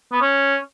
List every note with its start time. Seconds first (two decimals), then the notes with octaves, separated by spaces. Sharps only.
0.12 B3
0.21 C#4